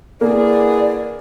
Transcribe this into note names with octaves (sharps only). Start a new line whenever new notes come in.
D3 E3 A#3 G#4 D5